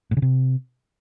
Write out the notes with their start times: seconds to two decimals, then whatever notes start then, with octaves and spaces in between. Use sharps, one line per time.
0.11 A2
0.17 C#3
0.22 C3